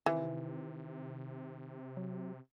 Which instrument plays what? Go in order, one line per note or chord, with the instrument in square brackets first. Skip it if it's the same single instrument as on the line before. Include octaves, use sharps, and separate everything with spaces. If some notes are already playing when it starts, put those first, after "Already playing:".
[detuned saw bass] C3 [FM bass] D#3 [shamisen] E3
[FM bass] F#3